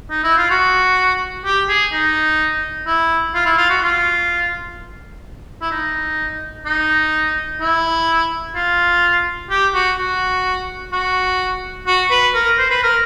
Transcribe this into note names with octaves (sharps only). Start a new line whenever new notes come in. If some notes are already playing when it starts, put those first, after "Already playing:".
D#4
E4
F4
F#4
G4
G#4
D#4
E4
F4
E4
F4
F#4
F4
E4
D#4
D#4
E4
F4
G4
F#4
F#4
F#4
F#4
B4
A#4
C5
B4
A#4